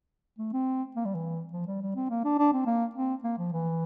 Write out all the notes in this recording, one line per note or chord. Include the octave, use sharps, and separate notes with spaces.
A3
C4
A#3
G3
E3
F3
G3
G3
C4
A#3
D4
D4
C4
A#3
C4
A#3
F3
E3